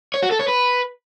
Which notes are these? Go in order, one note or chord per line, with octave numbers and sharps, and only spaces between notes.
C#5
F#4
A4
C#5
B4